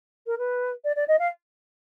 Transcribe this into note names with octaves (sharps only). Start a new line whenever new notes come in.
A#4
B4
D5
D5
D#5
F5